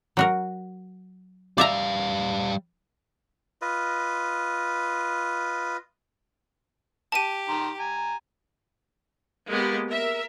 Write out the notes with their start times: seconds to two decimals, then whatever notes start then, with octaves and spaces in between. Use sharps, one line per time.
0.17 F#3 F#4 A#4
1.58 G3 D5 E5 F5 A#5
3.62 F4 B4 D#5
7.12 G4 A5 D#7
7.49 D#3 A#5 C6
7.79 G#5 A#5
9.48 G#3 A#3 B3 G4
9.89 A#4 E5